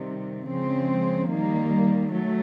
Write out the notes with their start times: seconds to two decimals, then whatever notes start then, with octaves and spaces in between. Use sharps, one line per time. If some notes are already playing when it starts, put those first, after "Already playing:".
Already playing: C3 D#3 G3
0.48 C#3 F3 G#3 C4
1.30 D#3 G3 A#3
2.12 F#3 A3